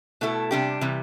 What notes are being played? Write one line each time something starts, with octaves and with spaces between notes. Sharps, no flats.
B2 A3 E4 A4
C3 G3 D4 G4
C3 E3 G3